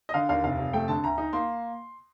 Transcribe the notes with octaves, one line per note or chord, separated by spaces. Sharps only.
D#5
D3 F5
D#2 F5
F1 F5
F1
A3 G5
D3 A5
D2 A#5
D#4
A#3 C6